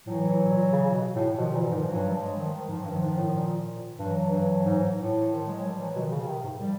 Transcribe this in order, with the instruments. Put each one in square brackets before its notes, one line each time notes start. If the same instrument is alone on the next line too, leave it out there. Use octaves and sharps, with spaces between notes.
[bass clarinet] A2 [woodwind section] E3 F#3
[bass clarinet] A2
A#2
C#3
B2
A2
[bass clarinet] B2 [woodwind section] D#3 F3
[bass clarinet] A#2 [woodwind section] D3 E3
[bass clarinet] G#2 [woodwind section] D#3 F3
[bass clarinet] G2 [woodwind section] E3 F#3
[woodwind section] F3 G3
F#3 G#3
D#3 F3
D#3
[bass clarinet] G#2 [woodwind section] F3
[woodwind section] F#3
[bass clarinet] G2
[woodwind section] D#3 F3
[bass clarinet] G#2
A2
A#2
[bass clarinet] G2 [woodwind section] E3 F#3
[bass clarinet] G2
G#2
A2
[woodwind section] D#3 F3
F#3 G#3
F3 G3
E3 F#3
[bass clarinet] B2 [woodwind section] D#3 F3
[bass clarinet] C#3
[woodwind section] D#3
[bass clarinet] C3
G#2
[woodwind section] F3 G3